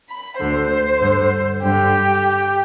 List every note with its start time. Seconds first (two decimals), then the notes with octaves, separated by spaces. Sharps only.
0.09 B5
0.40 D2 D3 C5
1.01 G2 D3
1.63 G2 D3 G4